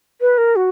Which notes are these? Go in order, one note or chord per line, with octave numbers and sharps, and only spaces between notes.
B4
A#4
F#4